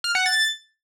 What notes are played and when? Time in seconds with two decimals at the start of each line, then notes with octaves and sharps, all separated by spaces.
0.04 F6
0.15 F#5
0.26 A6